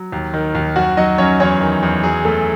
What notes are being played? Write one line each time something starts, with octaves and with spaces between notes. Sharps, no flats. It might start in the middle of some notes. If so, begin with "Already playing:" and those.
Already playing: F#3
D#2
D#3
D#2
F#2 F#4 F#5
F#3 D#4 D#5
F#2 C#4 C#5
E2 C#4 C#5
D#3
E2
F#3 G#4
F#2 A3 A4